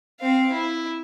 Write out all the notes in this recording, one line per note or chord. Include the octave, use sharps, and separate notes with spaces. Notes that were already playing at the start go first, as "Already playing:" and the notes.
C4 F5
E4